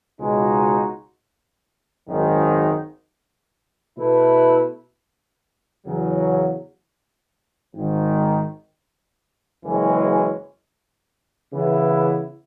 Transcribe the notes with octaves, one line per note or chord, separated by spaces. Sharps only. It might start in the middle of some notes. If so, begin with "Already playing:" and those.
C#2 B2 G#3 D#4 F#4
G#1 F#2 D#3 G#3 D#4
B2 A3 E4 B4
E2 C#3 F#3
G#1 G#2 D#3
F#1 F#2 E3 G#3 C#4
C#3 E3 B3 E4